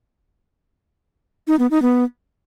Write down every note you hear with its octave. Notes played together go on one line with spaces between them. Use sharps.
D#4
B3
D#4
B3